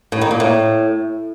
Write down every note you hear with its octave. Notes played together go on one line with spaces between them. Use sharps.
A2
D#3
A#2
A2